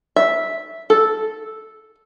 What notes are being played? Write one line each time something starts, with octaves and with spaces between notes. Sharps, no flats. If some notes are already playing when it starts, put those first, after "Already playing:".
E5
A4